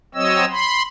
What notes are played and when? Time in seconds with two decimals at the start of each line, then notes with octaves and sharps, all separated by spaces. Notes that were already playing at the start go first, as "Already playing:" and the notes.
0.15 F#3 C4 C#5 D#5 E6
0.51 B5 C6